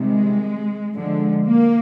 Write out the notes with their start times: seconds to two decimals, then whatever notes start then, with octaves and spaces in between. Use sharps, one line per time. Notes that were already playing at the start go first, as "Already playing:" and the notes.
Already playing: C3 D#3 G3 G#3
0.95 D3 F3 G#3
1.45 A#3